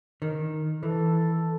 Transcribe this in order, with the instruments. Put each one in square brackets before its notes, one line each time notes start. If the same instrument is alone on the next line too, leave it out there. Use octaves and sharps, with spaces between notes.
[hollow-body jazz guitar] D#3
[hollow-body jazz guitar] E3 [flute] A4